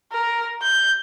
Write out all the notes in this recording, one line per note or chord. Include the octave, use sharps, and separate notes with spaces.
A#4
G6